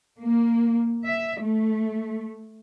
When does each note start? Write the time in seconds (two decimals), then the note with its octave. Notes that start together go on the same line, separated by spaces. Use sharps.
0.19 A#3
1.05 E5
1.41 A3